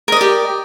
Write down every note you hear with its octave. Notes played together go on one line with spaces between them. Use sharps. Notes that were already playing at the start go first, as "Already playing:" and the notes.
G4 A#4 D5 D#5